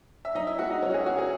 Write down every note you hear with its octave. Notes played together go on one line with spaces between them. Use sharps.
E5
F#2 D#4 D#5
E4 E5
G#3 F#4 F#5
D#4 D#5
F#2 C#4 C#5
F#4
G#4
C#3 F#4
G#4